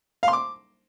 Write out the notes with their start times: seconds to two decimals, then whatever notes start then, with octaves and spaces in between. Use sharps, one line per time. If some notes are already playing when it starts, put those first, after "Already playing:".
0.23 F5
0.28 C6
0.33 D6